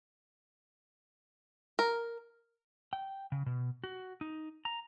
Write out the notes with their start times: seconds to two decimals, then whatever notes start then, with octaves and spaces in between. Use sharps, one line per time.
1.79 A#4
2.93 G5
3.32 C#3
3.46 B2
3.84 F#4
4.21 D#4
4.65 A#5